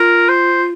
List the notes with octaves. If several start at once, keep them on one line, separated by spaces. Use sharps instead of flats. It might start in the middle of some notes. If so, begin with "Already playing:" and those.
Already playing: F4 A#4
C5